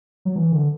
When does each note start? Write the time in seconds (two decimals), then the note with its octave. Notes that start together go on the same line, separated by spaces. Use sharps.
0.25 F#3
0.36 E3
0.52 D3